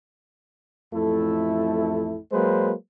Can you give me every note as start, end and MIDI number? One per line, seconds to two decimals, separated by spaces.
0.94 2.18 33
0.94 2.18 41
0.94 2.18 57
0.94 2.18 64
0.94 2.18 69
2.32 2.72 54
2.32 2.72 56
2.32 2.72 58
2.32 2.72 71
2.32 2.72 72